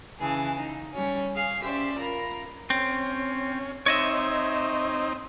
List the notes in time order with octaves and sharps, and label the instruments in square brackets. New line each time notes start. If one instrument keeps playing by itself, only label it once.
[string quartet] C#3 E3 G#4 A5
D#4
G3 C#4
G#4 F5
C#4 G4 C5 D5 E5
F4 A#4 A#5 B5
[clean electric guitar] C4 [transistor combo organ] C#4
[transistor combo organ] C4 D#4 [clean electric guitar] C#5 D#5 E5